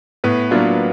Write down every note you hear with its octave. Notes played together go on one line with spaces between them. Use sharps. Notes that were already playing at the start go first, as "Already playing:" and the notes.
A2 B3 B4
F#3 A#3 D4 F4